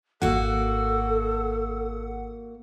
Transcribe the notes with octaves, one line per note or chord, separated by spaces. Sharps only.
G#1 A#3 F#4 A4 F#5